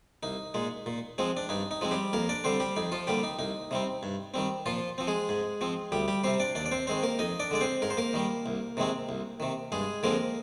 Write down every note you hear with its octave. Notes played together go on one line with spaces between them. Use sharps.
C2 D#4
A#2 G#3
A#2
F3 G#3 C4
D4
G2 D#4
D#4
F3 G#3 C4
G3 G4
F2 A#3 A#4
D4 D5
D3 G3 C4 C5
G3 G4
F2 D#4
F3 F4
D3 G3 A#3 G4
D#4
C2 D#4
C3 G3 C4
G2
D#3 G3 C4
A#2 F3 F4
F3 C4
G#3 G#4
G#2
F3 C4
D2 G3 G4
G3 G4
C3 G3 C4 C5
D4 D5
D#2 D4 D5
D5
C4 C5
D#3 G#3 C4 C5
A#3 A#4
F2 D#4 D#5
D4 D5
D3 G#3 D5
C4 C5
G#2 A#4
C5
A#3 A#4
D#3 G3
C2
C3 D#3 G#3 C4
C2
C3 D#3
G2 G#3 G#4
D3 F3 G#3 A#3 C4 A#4